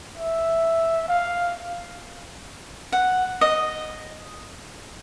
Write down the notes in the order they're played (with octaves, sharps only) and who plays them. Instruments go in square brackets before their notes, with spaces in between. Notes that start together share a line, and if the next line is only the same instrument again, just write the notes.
[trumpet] E5
F5
[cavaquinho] F#5
D#5